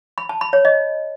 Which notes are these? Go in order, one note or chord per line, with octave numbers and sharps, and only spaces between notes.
B5
A5
B5
C#5
D#5